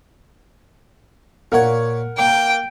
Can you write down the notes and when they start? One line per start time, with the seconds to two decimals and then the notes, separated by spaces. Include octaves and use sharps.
1.52 A#2 A#4 C#5 F#5
2.18 A#3 G5